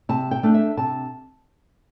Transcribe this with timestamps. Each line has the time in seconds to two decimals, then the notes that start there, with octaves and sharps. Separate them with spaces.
0.09 C3 A5
0.31 G5
0.43 A3 D4
0.54 E5
0.77 C3 A5